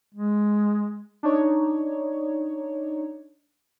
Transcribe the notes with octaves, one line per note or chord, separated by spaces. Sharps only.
G#3
D4 D#4 C#5